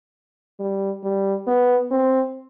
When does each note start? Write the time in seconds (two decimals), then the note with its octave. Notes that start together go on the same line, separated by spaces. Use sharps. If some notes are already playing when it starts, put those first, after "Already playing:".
0.60 G3
1.03 G3
1.47 B3
1.91 C4